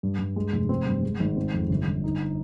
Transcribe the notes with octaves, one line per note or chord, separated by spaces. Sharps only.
G2
G2
G#3
F1
C4
G2
G#3
G#1
C4
F2
G1
G1
D#4